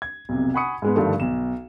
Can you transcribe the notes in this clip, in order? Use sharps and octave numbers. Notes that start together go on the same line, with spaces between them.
G#6
B1 F2 C3
F#5 G#5 B5 C#6 D#6 C#7
G#2 G#3 B3
G2 D3 D#3 F3 G3 A3
B1 E7